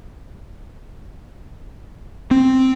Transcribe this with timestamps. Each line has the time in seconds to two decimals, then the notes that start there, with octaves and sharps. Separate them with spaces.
2.31 C4